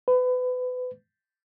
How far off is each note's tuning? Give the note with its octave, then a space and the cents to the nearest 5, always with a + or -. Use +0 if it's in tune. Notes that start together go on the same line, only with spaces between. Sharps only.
B4 +30